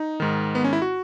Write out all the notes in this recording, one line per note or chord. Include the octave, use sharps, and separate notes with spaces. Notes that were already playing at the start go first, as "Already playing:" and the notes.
Already playing: D#4
G#2 D#3
B3
C#4
E4
F#4